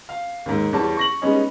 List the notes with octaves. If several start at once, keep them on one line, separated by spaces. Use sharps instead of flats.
F5
D#2 G#2
E2 G3 C#5 A5
C#6 A#6 F#7
G3 G#3 B3 C#4 D#4